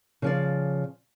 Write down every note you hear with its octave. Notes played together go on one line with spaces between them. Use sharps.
C#3 F3 D5